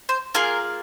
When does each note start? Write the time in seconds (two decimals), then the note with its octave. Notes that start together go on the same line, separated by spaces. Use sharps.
0.09 C5
0.35 A#3 F4 G#4 A#4